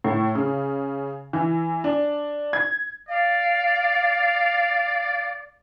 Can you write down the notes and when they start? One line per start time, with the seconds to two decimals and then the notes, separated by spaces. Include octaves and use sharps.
0.04 A2
0.35 C#3
1.33 E3
1.84 D4
2.53 G#6
3.09 D5 F5